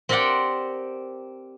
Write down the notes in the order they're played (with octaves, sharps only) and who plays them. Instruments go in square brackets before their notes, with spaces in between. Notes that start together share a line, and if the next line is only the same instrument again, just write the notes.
[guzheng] C4 G4 A#4 D5 F#5 G5